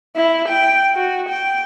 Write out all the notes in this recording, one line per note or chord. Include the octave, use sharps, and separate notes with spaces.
E4
G5
F#4
G5